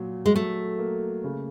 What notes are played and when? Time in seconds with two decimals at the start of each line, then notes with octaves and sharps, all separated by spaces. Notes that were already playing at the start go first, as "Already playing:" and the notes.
Already playing: A#2 F#3
0.26 G#3
0.35 F#3 A3
0.79 A#3
1.24 C#3